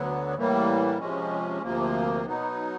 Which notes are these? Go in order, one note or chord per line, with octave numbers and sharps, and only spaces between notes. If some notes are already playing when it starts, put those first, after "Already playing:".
Already playing: D2 D3 F#3 B3
A2 E3 G3 A#3
C3 F3 G#3 C#4
D2 C3 F3 A#3
B2 F#3 B3 D#4